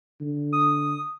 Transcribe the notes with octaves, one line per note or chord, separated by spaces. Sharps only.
D3
D#6